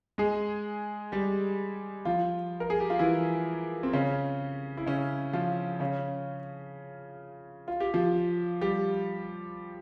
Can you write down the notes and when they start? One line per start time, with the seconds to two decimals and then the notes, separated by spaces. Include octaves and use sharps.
0.18 G#3 G#4
1.12 G3 G4
2.05 F3 F4
2.60 A#4
2.70 G#4
2.80 G4
2.90 F4
2.99 E3 E4
3.83 C4
3.93 C#3 C#4
4.77 E4
4.87 C#3 C#4
5.33 F3 F4
5.80 C#3 C#4
7.68 F4
7.80 G4
7.94 F3 F4
8.61 G3 G4